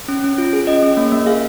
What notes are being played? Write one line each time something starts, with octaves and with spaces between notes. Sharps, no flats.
C#4
C#4
F4
G#4
C#4 D#5
C#4
A#3
A#3
G#4 F5